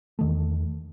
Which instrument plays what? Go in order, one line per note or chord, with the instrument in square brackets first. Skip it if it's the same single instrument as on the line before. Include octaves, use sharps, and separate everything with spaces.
[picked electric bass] E2 D#3 A3